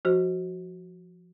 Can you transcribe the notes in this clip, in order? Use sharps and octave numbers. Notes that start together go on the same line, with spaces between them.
F3 F#4 C5